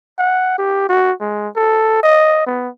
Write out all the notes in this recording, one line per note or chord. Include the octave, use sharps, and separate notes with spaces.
F#5
G4
F#4
G#3
A4
D#5
B3